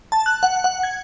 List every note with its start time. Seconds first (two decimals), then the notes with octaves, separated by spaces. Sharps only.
0.12 A5
0.26 F#6
0.43 F#5
0.64 F#5
0.83 G#6